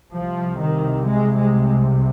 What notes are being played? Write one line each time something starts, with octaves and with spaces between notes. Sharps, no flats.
C2 C3 F3
D#3
G#3
G#3